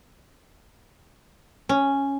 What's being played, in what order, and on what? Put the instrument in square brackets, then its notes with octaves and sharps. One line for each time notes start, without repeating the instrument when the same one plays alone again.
[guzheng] C#4